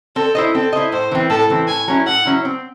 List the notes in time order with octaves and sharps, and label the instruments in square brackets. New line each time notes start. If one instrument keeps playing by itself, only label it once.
[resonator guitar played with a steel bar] C4 [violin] A4
[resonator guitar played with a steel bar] E4 C5 D#5
[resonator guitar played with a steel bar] C4 [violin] A4
[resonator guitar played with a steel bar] E4 C5 D#5
[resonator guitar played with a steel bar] A2 [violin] C5
[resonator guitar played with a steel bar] E3 C4
[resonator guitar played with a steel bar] A2 [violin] A4
[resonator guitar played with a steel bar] E3 C4
[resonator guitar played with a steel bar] A2 [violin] G#5
[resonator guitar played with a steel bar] F#3 C#4 E4
[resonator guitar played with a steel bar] A2 [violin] F#5
[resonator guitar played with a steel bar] F#3 C#4 E4
C4